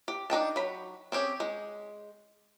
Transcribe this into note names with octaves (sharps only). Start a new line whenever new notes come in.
G4
D4 D#4 G5 A5
F#3 B5
C4 C#4 G4 G#4
G#3